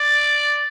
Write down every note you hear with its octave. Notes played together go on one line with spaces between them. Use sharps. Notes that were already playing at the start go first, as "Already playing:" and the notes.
Already playing: D5